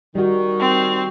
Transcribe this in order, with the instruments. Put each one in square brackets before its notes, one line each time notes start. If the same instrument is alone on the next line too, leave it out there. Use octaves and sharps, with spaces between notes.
[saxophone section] D#3 [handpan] G3 F#4
[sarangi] C4